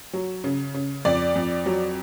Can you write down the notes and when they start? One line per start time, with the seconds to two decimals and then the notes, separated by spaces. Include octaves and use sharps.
0.13 F#3
0.44 C#3
0.74 C#3
1.05 F2 D5
1.36 F2
1.66 F#3